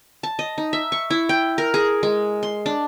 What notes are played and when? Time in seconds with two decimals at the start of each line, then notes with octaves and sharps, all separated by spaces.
0.23 A5
0.39 D#5
0.58 D#4
0.73 E5
0.92 C#6
1.10 E4
1.29 G5
1.58 A#4
1.74 G#4
2.03 G#3
2.43 C6
2.66 D4